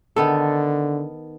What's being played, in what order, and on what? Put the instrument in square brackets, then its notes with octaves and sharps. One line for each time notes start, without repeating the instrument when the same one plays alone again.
[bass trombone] D3 [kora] D#3 B3 A4